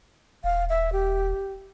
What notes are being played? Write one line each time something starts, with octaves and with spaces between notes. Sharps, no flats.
D#1 F5
E5
G4